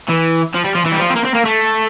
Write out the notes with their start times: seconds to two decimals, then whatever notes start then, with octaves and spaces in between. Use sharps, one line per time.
0.09 E3
0.55 F3
0.64 G3
0.75 F3
0.86 E3
0.92 G3
1.00 F3
1.10 C4
1.16 A#3
1.25 C4
1.35 A#3
1.45 A3